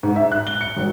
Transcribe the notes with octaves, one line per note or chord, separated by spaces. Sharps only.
G#2
E5
F#6
G7
C#7
G#1